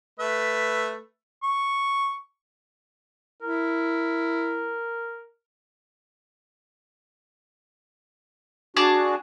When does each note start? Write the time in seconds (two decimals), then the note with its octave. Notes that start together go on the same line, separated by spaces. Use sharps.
0.20 A3 B4 E5
1.43 C#6
3.42 E4 A#4
8.77 D4 F#4 G#4 A5 D6